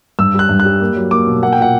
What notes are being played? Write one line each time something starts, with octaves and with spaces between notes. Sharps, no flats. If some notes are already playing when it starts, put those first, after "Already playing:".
G2 E6
G3 F#6
G2
F#6
G3
A#3
F#3
A#3 D6
B2
A#3 F#5
G5
A#2 F#5